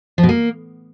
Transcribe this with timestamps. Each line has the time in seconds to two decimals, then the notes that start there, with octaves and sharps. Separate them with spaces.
0.18 F3
0.23 B2
0.29 A#3